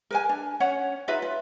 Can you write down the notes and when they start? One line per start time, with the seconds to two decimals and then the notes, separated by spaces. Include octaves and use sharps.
0.11 A#4 B4 G#5
0.29 D4
0.60 C#4 C#5 F#5
1.08 D#4 F4 B4 E5
1.22 F4